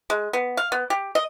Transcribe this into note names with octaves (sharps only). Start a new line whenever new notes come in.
G#3
B3
F5
B3
G4
D#5